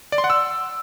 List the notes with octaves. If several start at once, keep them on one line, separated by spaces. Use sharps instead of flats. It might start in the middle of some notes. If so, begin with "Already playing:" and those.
D5
C6
F#5
E6